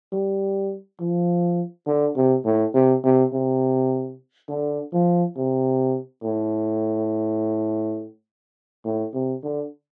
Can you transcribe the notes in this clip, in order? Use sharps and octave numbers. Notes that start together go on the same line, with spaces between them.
G3
F3
D3
C3
A2
C3
C3
C3
D3
F3
C3
A2
A2
C3
D3